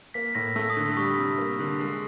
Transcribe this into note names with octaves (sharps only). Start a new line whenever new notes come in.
A#3 B6
A2 A#6
A3 E6
D#6
D3
G3 C#6
C3
A#3
D3
G#3